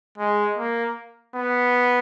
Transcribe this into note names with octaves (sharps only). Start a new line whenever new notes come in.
G#3
A#3
B3